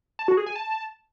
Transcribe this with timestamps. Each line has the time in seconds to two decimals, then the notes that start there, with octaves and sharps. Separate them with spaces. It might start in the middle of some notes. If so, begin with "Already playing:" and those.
0.19 A5
0.28 F#4
0.37 G#4
0.46 G#5
0.56 A5